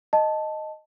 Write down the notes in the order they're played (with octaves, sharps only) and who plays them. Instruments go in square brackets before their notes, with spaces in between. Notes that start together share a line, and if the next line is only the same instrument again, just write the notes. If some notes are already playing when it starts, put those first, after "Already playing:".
[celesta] D#5 A5